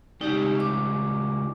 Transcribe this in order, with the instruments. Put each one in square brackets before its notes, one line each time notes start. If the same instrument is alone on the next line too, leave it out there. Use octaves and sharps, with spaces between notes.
[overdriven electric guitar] C#2 G3 [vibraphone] D#4 G4
[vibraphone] D6